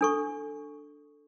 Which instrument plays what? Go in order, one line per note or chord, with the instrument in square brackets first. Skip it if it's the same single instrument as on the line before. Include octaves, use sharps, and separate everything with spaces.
[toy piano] D4 A4 C#6